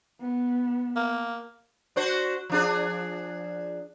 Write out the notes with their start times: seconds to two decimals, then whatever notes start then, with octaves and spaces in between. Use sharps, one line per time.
0.21 B3
0.96 A#3
1.96 D4 F#4 C5
2.50 F3 D4 G#4